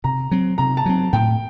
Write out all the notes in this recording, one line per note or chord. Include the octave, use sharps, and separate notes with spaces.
C3 A#5
F#3 C4
C3 A#5
A5
F#3 C4
A2 G5